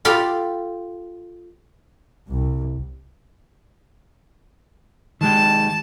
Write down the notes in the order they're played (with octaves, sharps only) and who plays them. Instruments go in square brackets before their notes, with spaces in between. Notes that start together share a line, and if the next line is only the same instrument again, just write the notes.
[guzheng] F4 G4 A4 F5 B5
[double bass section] C2
[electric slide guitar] D#3 G#3 G4 [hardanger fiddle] A5